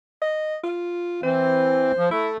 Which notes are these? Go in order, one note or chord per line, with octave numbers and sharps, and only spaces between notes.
D#5
F4
E3 C4 C5
F3
A3 E4